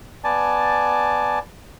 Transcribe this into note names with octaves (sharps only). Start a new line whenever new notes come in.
B3 D5 G#5 A5